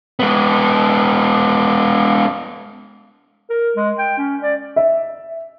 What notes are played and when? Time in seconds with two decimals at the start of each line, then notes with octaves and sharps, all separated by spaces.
0.20 G#3 B3
3.50 A#4
3.77 G#3
3.99 G5
4.18 C#4
4.42 D5
4.76 E5